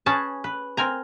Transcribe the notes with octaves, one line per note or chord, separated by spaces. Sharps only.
C#4 G#4 B4 A5
B4
C4 A#4 G#5 A#5